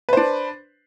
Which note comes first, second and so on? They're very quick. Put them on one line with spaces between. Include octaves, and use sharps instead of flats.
B4 C5 D4